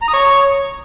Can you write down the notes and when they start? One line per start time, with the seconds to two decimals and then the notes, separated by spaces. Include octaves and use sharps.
0.02 A#5
0.07 D#6
0.13 C#5